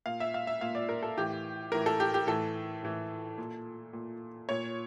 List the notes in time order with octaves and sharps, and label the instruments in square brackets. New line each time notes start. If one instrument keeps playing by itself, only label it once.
[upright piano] A#2 F5
E5
F5
E5
A#2 F5
D5
A#4
A4
A2 E3 G4
A2 E3 A#4
A4
G4
G4
A2 E3 A4
A2 E3
A#2
A#2
A#2 C#5